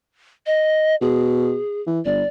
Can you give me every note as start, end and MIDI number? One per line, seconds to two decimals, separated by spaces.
0.46 0.96 75
1.02 1.57 47
1.02 1.81 68
1.87 2.00 52
2.05 2.23 31
2.05 2.28 74